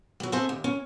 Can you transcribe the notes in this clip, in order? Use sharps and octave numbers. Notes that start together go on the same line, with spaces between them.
F#3 G3
C4 G#4 A4 C5 E5 A5
D#2
C#4